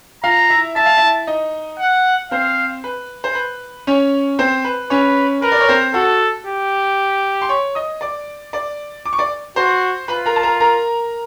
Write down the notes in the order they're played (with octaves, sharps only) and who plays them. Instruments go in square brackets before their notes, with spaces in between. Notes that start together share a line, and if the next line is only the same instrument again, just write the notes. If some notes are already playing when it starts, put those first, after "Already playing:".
[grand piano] F4 F5 [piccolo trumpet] A#5
[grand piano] E4 E5
[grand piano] E5 [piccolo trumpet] A5
[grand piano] F5
E4 E5
D#4 D#5
[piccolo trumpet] F#5
[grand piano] C4 C5 [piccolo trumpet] F5
[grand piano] B4
C5
B4
C#4 C#5
C4 C5
B4
[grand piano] C#4 C#5 [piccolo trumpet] B4
[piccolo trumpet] A#4 [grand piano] B4
[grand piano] D5
C#5
C4 C5
[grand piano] F#4 F#5 [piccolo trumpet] A4
[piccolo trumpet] G4
[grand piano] C6
C#5 C#6
D#5 D#6
D5 D6
D5 D6
D6
C#6
D5 D6
[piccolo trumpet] F#4 [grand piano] C5 C6
[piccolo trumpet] F4 [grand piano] B4 B5
[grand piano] A#4 A#5
A5
A#4 A#5
A#4 A#5